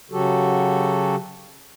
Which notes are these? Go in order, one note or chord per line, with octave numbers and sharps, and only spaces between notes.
C#3 F#3 F#4 G4 A4